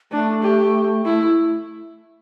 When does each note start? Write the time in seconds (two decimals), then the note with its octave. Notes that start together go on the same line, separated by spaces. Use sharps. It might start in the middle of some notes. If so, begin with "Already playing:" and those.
0.12 A3 D4
0.42 G4
1.05 A3 E4